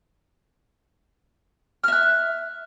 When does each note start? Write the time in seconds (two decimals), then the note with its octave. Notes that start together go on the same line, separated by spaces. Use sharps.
1.84 F6
1.88 E5
1.92 F#6